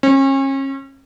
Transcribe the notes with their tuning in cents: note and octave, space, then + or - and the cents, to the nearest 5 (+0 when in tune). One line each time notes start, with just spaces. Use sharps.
C#4 -35